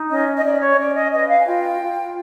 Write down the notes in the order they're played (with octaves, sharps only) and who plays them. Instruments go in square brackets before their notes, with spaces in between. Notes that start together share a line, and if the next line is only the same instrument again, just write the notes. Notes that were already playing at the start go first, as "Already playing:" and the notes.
Already playing: [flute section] D#4
C#4 D#5
D#5
C#4 D5
C#5
C#4 D5
D#5
B4 D#5
F5
G#5
F4 G5
F4